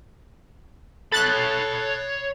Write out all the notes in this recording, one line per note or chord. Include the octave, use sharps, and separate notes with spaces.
A4 C#5 B5 F#6 A6